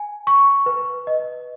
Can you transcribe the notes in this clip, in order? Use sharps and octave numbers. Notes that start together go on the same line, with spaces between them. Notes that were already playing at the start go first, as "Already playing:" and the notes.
Already playing: G#5
C#6
B4
D#5